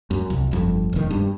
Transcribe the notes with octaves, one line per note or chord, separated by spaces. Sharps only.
F#2
C2
G1 F2
E1 D#3
G2